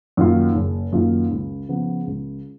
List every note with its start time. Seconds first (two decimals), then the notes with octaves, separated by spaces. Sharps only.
0.17 F#2 D#3 A#3 F4
0.55 F#1
0.92 F#2 D#3 A#3 F4
1.31 C#2
1.69 C#3 F3 B3
2.07 C#2